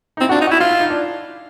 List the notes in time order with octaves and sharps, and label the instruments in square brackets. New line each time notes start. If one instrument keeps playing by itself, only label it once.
[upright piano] D#4
[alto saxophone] C4 [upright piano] E4
[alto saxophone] D4 [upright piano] F4 F#4
[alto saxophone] D#4
[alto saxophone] E4 [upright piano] F#4
[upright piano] E4 [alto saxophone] F4
[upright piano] E4
D#4
D4